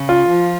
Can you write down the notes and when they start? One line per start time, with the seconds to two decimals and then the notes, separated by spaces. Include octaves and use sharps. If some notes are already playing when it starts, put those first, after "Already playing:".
Already playing: C#3
0.09 F4
0.28 F3